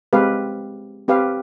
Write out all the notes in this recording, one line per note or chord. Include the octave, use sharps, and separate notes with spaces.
G#3 C4 G4 B4 F5
C4 G4 B4 F5